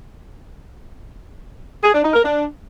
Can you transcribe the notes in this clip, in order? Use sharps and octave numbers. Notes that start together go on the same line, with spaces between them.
G#4
D4
D#4
A#4
D4